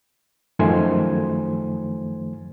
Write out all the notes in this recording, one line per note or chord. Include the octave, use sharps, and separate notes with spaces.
F#2 D#3 F3 A3 C5 G#5